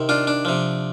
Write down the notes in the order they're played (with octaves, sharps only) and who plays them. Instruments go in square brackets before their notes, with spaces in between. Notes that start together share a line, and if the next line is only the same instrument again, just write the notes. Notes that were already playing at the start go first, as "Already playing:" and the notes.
Already playing: [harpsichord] C3 D#3
D4 F4
D4
C3 F3